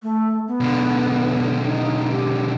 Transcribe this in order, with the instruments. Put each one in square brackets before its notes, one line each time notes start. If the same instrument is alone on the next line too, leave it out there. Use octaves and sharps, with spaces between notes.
[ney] A3
B3
[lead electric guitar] B1 D3
[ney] D#4
G4